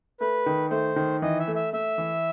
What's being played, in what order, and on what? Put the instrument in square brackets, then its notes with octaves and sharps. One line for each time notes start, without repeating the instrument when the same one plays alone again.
[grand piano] A3 [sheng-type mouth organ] B4
[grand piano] D#3
[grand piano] A3 [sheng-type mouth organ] C5
[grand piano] D#3
[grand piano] E3 [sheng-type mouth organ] D#5
[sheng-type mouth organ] E5
[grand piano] A3
[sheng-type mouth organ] E5
[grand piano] A3 [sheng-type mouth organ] E5
[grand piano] E3